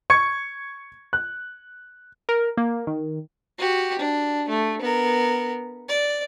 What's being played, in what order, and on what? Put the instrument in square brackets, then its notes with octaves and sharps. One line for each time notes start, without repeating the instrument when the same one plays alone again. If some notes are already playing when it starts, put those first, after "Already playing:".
[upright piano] C#6 G#6 C#7
F#6
[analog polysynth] A#4
A#3
D#3
[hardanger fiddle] F#4 G4
D4
A3
B3 A#4
D5